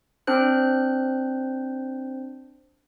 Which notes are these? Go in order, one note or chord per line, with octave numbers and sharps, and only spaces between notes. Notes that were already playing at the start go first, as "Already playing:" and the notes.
C4 D4 C5 F#6